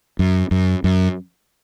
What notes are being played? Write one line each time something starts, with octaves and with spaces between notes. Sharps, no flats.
F#2
F#2
F#2